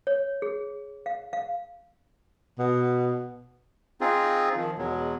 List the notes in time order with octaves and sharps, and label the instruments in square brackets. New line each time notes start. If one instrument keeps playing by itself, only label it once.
[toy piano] C#5
G#4
F5
F5
[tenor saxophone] B2
[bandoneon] C4 D#4 F4 G#4
D#3 F3
E2 B2 F#3 G#3